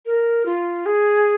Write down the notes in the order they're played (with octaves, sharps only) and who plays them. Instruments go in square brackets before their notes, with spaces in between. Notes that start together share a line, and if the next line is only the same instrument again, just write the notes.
[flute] A#4
F4
G#4